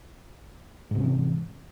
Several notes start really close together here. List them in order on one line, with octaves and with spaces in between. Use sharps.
G#2 C3 C#4 E3